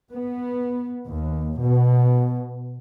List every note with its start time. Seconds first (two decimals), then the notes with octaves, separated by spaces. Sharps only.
0.12 B3
1.07 D#2
1.61 B2